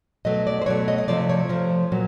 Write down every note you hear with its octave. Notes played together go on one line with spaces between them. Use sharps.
B2 F#3 A3 D#5
D5
C5
B2 F#3 A3 C#5
D#5
D#5
C3 F3 A3 D5
C#5
C3 F3 A3
A#2 F#3